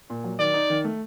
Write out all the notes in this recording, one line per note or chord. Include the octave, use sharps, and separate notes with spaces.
A#2
F#3
D#3 D5
D#4
D#3
A3